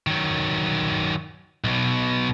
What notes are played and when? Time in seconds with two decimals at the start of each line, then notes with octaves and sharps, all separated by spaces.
0.07 D#3 F#3
1.64 B1 B2